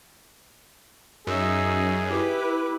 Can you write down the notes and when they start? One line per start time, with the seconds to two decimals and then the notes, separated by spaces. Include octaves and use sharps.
1.27 F#2 D#4 G#4 E5
2.07 E4 G4 B4 D6